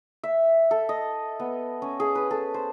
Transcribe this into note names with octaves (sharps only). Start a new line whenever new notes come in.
E5
A4
D#5
B3
C#4
G#4
B4
A4
C5